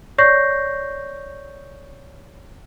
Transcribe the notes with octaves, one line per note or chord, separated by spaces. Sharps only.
C#5 D5 C#6 G6 A#6 C7